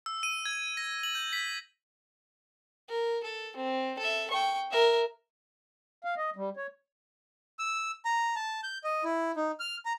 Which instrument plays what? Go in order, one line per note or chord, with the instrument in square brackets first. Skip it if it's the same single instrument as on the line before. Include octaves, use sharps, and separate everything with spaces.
[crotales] E6
D#7
G#6
A#6
F#7
G6
B6
[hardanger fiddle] A#4
A4
C4
A4 E5
G5 C#6
A#4 E5
[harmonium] F5
D#5
G3
C#5
[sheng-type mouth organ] E6
A#5
A5
G6
D#5
E4
D#4
F6
A#5